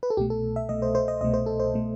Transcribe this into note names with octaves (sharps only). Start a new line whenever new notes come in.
B4
A4
C2 B2 A3 G4
A4
E5
C2 B2 A3 D#5
C5
C5
D#5
C2 B2 A3 D#5
C5
A4
C5
B2 A3